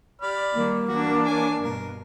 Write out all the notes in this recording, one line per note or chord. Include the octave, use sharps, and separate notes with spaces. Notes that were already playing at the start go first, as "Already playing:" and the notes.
G4 D5 B5 F6
D#3 G3 A#3
E3 D4 F#4
C#5 G#5 D6
G2 B2 A#4